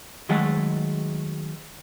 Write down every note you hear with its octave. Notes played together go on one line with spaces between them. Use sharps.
D#3 F#3 G#3 A3 G#4 F#5